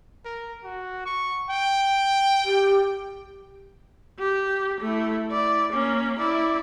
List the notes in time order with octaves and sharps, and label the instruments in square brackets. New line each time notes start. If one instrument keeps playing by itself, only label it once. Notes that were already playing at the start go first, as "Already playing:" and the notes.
[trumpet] A#4
F#4
C#6
G5
[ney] G4
[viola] G4
A3 E4
E4 D5
A#3 C#4
E4 D5